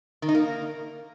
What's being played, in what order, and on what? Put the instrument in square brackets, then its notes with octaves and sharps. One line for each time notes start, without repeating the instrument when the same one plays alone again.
[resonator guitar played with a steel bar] D#3
D#4
A#3